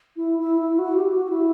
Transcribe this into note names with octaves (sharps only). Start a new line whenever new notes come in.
E4
E4
E4
F#4
G4
F#4
F#4
E4